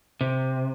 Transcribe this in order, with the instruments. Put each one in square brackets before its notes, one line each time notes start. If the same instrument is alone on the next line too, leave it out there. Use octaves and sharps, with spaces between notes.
[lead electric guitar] C3